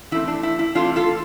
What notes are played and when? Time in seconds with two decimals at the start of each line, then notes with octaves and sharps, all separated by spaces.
0.11 E3 A3 C4 E4
0.28 D4
0.43 E4
0.59 E4
0.75 E3 A3 C4 D4 F4
0.96 F4 A4